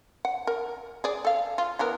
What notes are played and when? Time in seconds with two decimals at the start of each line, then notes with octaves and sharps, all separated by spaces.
0.25 F#5
0.47 A#4
1.04 G#4 D5
1.25 A4 F5
1.58 F4
1.79 E3 B3 A#4